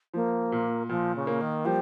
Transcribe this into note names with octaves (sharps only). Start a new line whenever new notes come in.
F3 A#3
A#2
A#2 F3
C#3
A#3
D#3
F3 G3